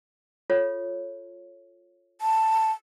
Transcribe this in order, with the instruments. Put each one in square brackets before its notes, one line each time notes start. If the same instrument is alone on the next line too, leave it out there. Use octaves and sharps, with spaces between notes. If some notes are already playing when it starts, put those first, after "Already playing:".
[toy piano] F4 A4 C#5
[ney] A5